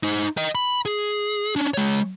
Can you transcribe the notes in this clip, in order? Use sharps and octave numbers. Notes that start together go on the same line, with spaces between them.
D#4 C5
D#5 G5
B5
G#4
C#4 D4
G#3 C#5